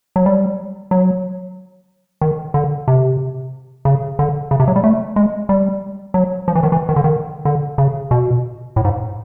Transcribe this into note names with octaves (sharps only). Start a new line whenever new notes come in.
F#3
G3
F#3
D#3
D3
C3
C#3
D3
C#3
C3
F#3
G3
A3
G#3
G3
F#3
F3
E3
D#3
E3
D#3
D3
D#3
D3
C#3
B2
A2
G#2